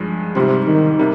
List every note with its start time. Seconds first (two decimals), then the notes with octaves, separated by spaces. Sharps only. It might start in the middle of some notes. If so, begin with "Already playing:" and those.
Already playing: G2 F3 G#3
0.36 G#2 C3 G3 C4 F4
0.67 D#3
0.99 C3 G3 A#3